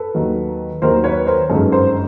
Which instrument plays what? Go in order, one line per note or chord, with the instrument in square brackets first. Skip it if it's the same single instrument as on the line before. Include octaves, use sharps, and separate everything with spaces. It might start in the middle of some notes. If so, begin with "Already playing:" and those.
Already playing: [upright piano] A4 B4
D#2 D#3 F#3
D#2 D#3 F#3 A#4 C5
B4 C#5
A#4 C5
G1 F#2 D#3 G#3 A4 B4
A#4 C5